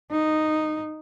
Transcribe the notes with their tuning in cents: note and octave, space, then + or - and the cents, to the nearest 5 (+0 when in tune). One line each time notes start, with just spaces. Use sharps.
D#4 -10